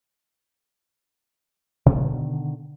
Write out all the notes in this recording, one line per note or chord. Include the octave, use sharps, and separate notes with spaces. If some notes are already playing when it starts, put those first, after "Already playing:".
B2 D3 D#3